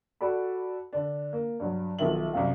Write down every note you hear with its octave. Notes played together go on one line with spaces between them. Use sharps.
F#4 A4 D5 B5
D3 D4
A#3
G2 F#3
B1 D#3 F3 A#4 E5 F#7
C2 F#2 F5